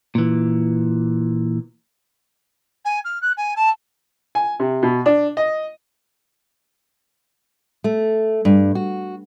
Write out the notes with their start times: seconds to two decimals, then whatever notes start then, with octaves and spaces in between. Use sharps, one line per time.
0.15 A#2 E3
2.84 G#5
3.04 F6
3.21 F#6
3.37 G#5
3.56 A5
4.35 G#5
4.60 C3
4.83 B2
5.06 D4
5.37 D#5
7.84 A3
8.45 G2
8.75 F#4